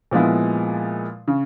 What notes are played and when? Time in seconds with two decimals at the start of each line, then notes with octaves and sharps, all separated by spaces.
0.11 A#2 F3 G#3 B3 E4
1.28 C#3